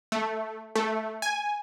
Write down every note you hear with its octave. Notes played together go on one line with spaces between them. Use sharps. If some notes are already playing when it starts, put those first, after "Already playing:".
A3
A3
G#5